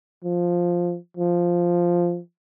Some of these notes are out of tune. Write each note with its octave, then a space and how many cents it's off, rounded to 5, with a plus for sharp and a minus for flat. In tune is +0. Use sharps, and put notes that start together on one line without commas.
F3 +5
F3 +0